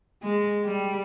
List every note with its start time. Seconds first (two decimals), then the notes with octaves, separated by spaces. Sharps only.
0.23 G#3
0.65 G3